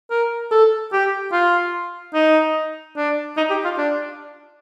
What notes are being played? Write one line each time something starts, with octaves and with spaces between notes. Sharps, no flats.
A#4
A4
G4
F4
D#4
D4
D#4
G4
F4
D4